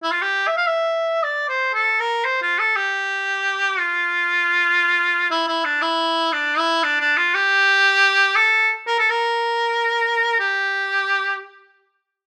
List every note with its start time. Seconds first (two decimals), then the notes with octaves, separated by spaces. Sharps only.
0.03 E4
0.12 F4
0.22 G4
0.47 E5
0.57 F5
0.67 E5
1.23 D5
1.49 C5
1.74 A4
2.00 A#4
2.25 C5
2.42 F4
2.59 A4
2.76 G4
3.78 F4
5.31 E4
5.48 E4
5.64 D4
5.82 E4
6.32 D4
6.58 E4
6.83 D4
7.00 D4
7.17 F4
7.34 G4
8.36 A4
8.87 A#4
8.99 A4
9.10 A#4
10.39 G4